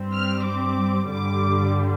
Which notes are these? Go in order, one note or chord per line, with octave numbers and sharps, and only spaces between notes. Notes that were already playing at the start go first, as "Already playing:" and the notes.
Already playing: G2 G3 C4
F6
D6
G2 D3 G3 D6